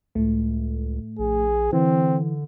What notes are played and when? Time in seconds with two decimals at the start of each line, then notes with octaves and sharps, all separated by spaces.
0.15 C#2 A2 A3
1.19 A#1 G#4
1.73 D3 E3 C4